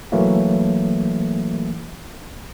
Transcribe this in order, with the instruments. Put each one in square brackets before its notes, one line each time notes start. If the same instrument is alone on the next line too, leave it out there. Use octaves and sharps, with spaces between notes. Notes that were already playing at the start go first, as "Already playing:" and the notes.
[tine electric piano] B1 E3 F#3 A3 A#3